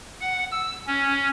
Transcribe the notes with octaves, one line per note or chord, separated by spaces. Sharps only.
F#5
E6
C#4